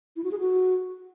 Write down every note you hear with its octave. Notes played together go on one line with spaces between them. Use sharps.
E4
F#4
G#4
F#4